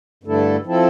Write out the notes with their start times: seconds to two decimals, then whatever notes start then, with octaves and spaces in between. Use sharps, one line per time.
0.24 G2 D3 A3 E4 A4
0.65 F3 C4 E4 A4